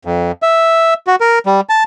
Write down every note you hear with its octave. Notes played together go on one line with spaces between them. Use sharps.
F2
E5
F#4
A#4
G3
A5